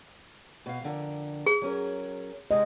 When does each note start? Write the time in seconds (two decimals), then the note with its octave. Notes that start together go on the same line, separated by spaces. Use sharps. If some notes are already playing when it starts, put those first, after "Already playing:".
0.66 B2 F5
0.82 F2 D3 A#4
1.46 G#4
1.62 F#3 C#4 A#4
2.51 C3 G#3 D#5